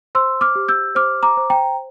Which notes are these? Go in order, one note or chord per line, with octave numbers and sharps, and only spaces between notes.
C5 C6 E6
D6 F6
G4
E6 G6
C5 D6 F6
A#5 D6
C5
G5 A#5